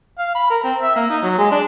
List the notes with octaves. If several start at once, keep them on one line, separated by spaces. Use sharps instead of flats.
F5
B5
A#4
C4
E5
A#3
D#4
F#3
G#3
D4